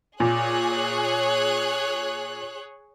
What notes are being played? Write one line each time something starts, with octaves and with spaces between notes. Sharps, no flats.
A#2 G#4 C#5 F#6